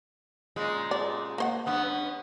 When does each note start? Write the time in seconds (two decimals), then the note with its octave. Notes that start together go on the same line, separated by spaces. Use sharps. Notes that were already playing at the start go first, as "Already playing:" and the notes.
0.56 A#2 C#3 G#3
0.91 D5
1.38 A#3 C5 F#5
1.66 G2 B3 C#4